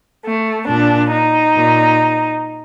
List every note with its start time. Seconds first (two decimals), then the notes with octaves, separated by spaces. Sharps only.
0.25 A3
0.68 A#2 D4
1.12 D#4
1.55 A#2